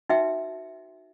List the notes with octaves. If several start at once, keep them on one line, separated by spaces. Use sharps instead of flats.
D#4 F#4 B4 E5 G5